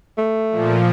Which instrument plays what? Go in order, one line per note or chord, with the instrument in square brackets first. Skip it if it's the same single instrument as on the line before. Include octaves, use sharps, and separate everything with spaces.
[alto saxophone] A3
[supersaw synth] A#2 F3